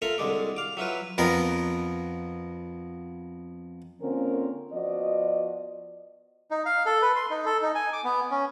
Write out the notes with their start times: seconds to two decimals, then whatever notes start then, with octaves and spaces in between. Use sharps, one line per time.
0.02 F4 A4 A#4 E5 F5
0.18 C2 D3 G#3 D5
0.57 F5 D6
0.77 F#3 E4 F4 B4
1.18 F2 B3 A#4
4.01 D3 A#3 C4 C#4 F4 A#4
4.73 F3 B3 F#4 D5 D#5
6.51 D#4
6.66 F5
6.86 A4
7.02 B4
7.16 C6
7.30 D#4
7.46 A4
7.62 D#4
7.75 G#5
7.93 D6
8.04 B3
8.31 C#4